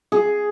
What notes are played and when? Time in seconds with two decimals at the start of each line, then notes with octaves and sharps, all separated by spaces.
0.12 G#4